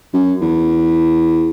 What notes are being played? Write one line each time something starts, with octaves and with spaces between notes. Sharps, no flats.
F#2
E2